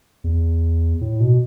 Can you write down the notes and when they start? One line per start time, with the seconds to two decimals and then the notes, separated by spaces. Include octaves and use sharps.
0.24 E2
1.01 A2
1.20 B2